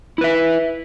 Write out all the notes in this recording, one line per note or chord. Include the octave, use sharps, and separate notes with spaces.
E4 B4 E5